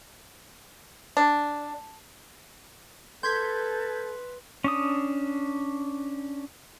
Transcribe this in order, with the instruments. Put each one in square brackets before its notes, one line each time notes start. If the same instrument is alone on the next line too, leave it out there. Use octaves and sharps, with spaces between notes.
[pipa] D4
[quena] A4 [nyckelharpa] B4 [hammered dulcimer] C6 [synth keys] G6 G#6 B6
[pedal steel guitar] C#4 D4 D#6